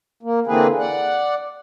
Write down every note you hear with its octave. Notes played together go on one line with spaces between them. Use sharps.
A#3
D3 E3 A#3 C4 G#4 B4
D5 F#5